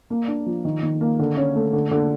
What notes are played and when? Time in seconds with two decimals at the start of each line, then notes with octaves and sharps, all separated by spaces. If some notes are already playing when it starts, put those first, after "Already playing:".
0.10 A#3
0.28 D4
0.46 F3
0.65 D#3
0.83 D#3
1.01 A#3
1.19 D3
1.37 C#4
1.55 A3
1.73 D3
1.91 D3